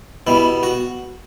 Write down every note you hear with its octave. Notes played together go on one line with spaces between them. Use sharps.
B2 G3 E4
F#4